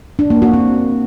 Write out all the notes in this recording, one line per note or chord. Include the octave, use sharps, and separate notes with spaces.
D4
A#3
F#4
C4